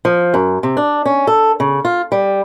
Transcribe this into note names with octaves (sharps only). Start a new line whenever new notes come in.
F3
F#2
C3
D4
C#4
A4
C#3
F4
G3